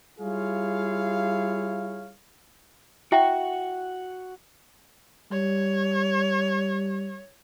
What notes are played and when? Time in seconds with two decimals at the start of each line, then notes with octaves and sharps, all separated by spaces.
0.19 G3 E4 F4 G#4 C#5 F5
3.12 E4 F#4 E5 F#5 G5
5.32 G3 C#5